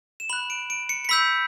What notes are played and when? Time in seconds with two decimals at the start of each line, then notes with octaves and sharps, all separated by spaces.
0.20 E7
0.29 B5 F#6 F#7
0.50 D7
0.70 D7
0.89 C#7
1.05 C#7
1.09 B5 E6 G6 B6